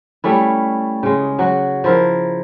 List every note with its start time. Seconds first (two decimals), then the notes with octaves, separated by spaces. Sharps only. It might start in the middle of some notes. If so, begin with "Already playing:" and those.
0.24 G3 A3 C#4 E4
1.03 C#3 G#3
1.39 F#3 F#4
1.84 F3 E4 A#4